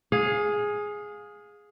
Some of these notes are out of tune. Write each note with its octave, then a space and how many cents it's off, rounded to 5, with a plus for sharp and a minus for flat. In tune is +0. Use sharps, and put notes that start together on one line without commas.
G#4 +0 F5 +30